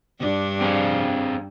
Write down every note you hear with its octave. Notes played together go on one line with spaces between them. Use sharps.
G2 D4
C4 G#4 F5